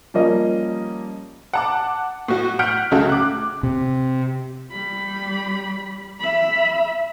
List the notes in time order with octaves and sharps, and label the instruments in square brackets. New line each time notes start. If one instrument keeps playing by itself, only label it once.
[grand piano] F3 G3 A#3 C#4 D#5
[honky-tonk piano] F#5 A5 D6
A2 F#4
F#5 F6 G6 B6 D7
C#2 C#3 A3 F#4
D6 F#6
[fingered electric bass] C3
[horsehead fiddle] G3 B5
E5 B5